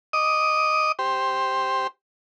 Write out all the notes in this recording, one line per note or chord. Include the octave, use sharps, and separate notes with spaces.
D#5 D6 D#6
G4 C5